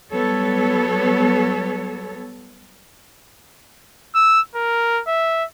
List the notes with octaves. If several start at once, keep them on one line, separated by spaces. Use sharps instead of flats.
F#3 G3 B3 A4 C#5
E6
A#4
E5